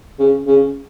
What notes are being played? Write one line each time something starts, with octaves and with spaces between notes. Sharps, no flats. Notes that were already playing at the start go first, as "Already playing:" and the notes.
C#3
C#3